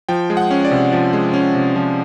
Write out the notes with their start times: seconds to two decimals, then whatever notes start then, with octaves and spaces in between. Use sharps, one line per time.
0.09 F3 G5
0.30 G#3
0.37 F#5
0.51 C#4
0.65 D5
0.71 C3
0.93 F3
1.13 G#3
1.34 C#4
1.55 C3
1.76 F3